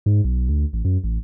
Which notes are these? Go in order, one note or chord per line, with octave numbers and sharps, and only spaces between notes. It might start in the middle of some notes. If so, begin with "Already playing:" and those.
G#2
B1
D2
A1
F#2
A1